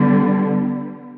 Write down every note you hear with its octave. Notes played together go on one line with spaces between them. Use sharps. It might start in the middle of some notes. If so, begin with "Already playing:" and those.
Already playing: D3 G3 B3